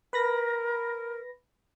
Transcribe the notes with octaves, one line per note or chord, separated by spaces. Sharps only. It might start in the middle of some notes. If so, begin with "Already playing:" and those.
A#4 B4 B5 A#6